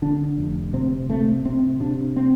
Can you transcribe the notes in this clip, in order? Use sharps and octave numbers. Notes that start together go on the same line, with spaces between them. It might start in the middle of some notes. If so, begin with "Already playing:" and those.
D3 D4
F1
C3 C4
C3 A3
C3 C4
C3 D4
C4